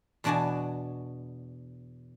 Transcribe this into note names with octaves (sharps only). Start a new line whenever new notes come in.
E2 B2 D4 F#4 G#5 A5